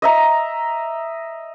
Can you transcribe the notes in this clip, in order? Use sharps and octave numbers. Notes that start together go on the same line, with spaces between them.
D#5 E5 A#5